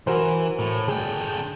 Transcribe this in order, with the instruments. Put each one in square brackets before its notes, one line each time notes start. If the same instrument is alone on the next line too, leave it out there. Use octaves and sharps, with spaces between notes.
[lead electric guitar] E3 [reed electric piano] F#4 A#4 C5
[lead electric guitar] A2
[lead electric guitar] D3 G5 [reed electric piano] G#4